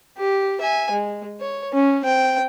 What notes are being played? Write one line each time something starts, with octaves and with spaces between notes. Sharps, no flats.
G4
E5 G#5
G#3
C#5
C#4
C4 G5